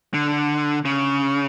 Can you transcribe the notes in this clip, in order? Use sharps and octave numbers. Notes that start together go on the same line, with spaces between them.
D3
C#3